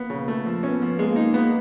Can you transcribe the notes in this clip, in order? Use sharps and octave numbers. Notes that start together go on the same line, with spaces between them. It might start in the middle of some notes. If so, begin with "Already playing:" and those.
Already playing: A#3 B3
C#3
A3
F3
B3 C#4
F3
G#3 A#3
D#4
B3